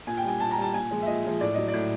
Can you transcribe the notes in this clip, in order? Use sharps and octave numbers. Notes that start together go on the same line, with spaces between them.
A#2 G#5
G5
G3 G#5
A#2 A5
A#5
G3 A5
A#2 G#5
F3 G#3
E5
A#2 D#5
F3 G#3
A2 D5
F#3 D#5
D5
A2